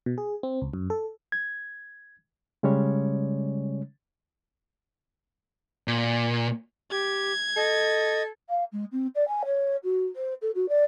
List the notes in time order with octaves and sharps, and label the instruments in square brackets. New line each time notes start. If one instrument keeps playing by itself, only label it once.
[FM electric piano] B2
G#4
C4
C#2
F#2
A4
[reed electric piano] G#6
C#3 G3 G#3 C#4 C#5
[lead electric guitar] A#2
[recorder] G4 [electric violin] G#6
[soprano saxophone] A4 [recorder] D#5
[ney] F5
G#3
C4
D5
G#5
C#5
F#4
C5
A4
F#4
D5